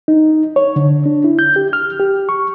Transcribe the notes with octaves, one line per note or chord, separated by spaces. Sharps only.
D#4
C#5
D3
D4
E4
G6
G4
F6
G4
C#6